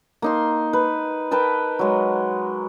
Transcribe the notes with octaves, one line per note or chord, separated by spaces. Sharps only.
A#3 D#4 C6
B4
A#4 B4 G5 A5
F#3 G#3